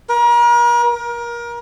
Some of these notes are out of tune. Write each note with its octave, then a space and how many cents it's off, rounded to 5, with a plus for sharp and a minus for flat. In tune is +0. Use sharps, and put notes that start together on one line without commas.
A#4 +40
A#4 +25